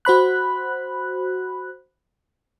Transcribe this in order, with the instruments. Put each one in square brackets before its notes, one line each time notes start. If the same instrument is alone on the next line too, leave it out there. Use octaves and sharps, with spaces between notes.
[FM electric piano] F#4 C5 B5 F#6